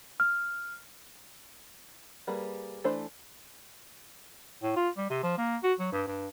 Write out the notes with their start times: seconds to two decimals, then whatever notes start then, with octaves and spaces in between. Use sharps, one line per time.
0.20 F6
2.27 G3 A#3 G#4 B4
2.84 E3 A3 D4 C5
4.63 A2
4.76 F4
4.97 G3
5.10 C3
5.23 F3
5.38 A#3
5.63 F#4
5.80 F#3
5.92 G2
6.07 G2